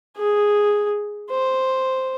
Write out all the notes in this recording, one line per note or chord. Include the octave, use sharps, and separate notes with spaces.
G#4
C5